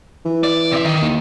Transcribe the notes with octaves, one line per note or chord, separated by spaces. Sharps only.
E3
D5
C3 E5
D#3
D#2